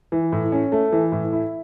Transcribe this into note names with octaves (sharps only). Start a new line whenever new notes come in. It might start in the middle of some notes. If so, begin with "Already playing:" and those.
E3
A2
C#4
A3
E3
A2
E4